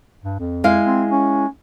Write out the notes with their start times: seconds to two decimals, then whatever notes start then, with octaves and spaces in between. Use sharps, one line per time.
0.24 G2
0.39 F2
0.64 G#3 E4 F5
0.84 C4
1.11 C#4